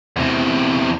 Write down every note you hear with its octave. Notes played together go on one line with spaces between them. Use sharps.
E2 C3